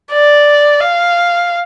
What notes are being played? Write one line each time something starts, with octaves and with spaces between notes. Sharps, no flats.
D5
F5